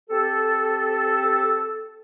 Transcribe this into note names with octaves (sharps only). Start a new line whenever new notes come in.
C4 G4 A4